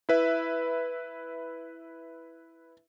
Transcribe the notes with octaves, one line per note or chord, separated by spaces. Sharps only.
E4 B4 E5